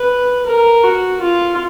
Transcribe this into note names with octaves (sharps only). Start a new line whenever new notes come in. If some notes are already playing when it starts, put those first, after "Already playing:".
Already playing: B4
A#4
F#4
F4